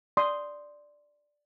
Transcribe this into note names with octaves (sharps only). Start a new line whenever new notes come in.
D5 C6 D#6